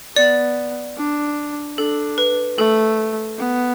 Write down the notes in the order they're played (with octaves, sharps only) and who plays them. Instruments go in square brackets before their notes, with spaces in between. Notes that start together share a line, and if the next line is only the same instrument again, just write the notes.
[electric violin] B3 [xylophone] D5
[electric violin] D4
[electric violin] D4 [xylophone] A4
[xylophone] B4
[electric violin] A3 [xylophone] A4
[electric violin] B3